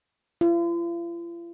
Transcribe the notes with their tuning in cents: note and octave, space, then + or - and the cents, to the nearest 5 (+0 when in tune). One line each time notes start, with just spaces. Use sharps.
F4 -45